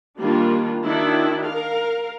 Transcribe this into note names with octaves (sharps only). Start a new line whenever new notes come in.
D#3 G3 A#3 D4 F4
D#3 D4 E4 F#4
A#4 F5